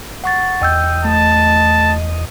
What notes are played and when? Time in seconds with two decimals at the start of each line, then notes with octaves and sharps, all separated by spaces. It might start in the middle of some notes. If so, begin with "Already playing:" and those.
0.24 F#5 C#6 A6
0.61 E2 D#5 G5 E6 G6
1.04 A3 A5